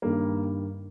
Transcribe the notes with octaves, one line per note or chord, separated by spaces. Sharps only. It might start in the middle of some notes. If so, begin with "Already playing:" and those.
G2 D#3 G3 A#3